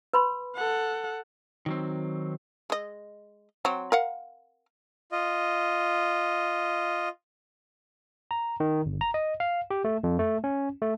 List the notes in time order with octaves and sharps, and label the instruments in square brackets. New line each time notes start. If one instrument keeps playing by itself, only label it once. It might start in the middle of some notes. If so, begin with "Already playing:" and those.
[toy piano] B4 B5 C6
[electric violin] A4 F#5
[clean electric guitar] D#3 F#3 C4
[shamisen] G#3 D#5
F#3 C4
A#4 F5 F#5
[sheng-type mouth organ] F4 D#5
[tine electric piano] A#5
D#3
G1
A#5
D#5
F5
G4
A3
F2
A3
C#4
A3